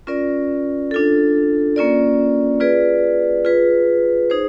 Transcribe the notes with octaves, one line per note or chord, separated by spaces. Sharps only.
C#4 F4 A#4 D5
D4 F4 A4
A#3 C#4 F4 A#4 D5
F4 G#4 B4 D5
F4 G#4 B4
D#4 G#4 C5